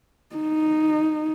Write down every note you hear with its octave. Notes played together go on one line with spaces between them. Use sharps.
D#4